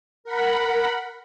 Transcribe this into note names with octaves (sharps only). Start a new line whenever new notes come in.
A#4 F#5 B5